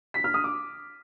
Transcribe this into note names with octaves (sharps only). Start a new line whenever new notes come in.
B6
F6
D#6
D6